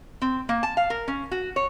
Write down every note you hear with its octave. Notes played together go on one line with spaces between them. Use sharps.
C4
A#3
A5
F5
A#4
C#4
F#4
C#5